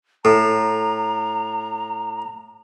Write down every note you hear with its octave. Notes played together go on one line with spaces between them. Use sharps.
A2 A4 A#5